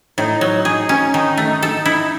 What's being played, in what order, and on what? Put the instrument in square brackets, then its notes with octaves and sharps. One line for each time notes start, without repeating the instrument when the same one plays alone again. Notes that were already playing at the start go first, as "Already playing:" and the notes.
[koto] A2 [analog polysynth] D#4
[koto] F#3
G#4
C#4
[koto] D#3 [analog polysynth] D#4
[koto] A3
A4
E4